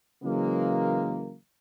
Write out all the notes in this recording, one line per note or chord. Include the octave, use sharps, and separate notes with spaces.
C#3 E3 F#3 G#3 A#3